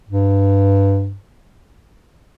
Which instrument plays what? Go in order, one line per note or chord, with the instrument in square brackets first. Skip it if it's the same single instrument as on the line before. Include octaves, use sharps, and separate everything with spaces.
[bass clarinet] G2